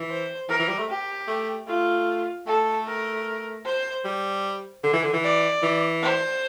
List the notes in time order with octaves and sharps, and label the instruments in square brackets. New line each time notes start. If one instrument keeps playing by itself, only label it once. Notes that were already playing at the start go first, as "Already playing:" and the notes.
Already playing: [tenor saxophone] E3
[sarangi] C5
[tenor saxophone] E3 [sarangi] A#4
[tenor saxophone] E3
G3
A3
[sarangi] G4
[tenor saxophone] A3
[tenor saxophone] A3 [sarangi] F4
[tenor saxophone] A3 [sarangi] A4
[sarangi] A#4
C5
[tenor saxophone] G3
D3
E3
D3
E3
[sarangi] D5
[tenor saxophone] E3
[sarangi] C5